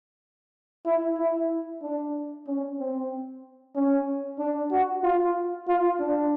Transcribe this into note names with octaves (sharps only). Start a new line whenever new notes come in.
E4
E4
D4
C#4
C4
C#4
D4
F#4
F4
F4
D4